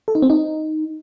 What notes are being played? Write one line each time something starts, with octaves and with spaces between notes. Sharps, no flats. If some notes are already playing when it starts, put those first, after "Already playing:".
A4
D#4
C4
D#4